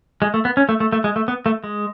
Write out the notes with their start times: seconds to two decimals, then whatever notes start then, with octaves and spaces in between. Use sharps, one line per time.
0.22 G#3
0.34 A3
0.45 B3
0.57 C#4
0.69 A3
0.80 A3
0.92 A3
1.04 G#3
1.16 A3
1.28 B3
1.46 A3
1.64 G#3